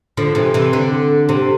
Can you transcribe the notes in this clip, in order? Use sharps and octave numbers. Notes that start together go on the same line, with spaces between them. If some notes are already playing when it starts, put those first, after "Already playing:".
D3 F3
C3 E3
C3 E3
D3
C3